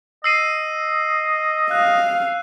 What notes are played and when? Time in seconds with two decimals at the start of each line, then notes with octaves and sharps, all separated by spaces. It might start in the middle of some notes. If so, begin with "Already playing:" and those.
0.24 D#5 E6 C7 D#7
1.71 F5 F#6